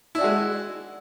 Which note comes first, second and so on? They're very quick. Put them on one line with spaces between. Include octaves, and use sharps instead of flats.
E4 D4 F#4 G#3